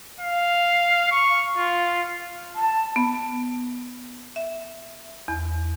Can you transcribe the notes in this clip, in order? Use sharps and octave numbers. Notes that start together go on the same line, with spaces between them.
F5
C#6
F4
A5
B3
E5
E2